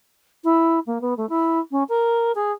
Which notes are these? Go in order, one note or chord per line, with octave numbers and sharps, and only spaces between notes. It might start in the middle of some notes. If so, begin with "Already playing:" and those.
E4
A#3
B3
A3
E4
C#4
A#4
G#4